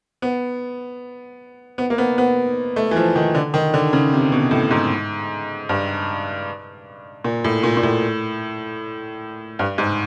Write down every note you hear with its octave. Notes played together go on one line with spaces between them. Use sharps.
B3
B3
A#3
B3
B3
A3
E3
F3
D#3
D3
D#3
D3
C#3
C3
B2
A2
G#2
G2
A#2
A2
A#2
A#2
A2
G2
G#2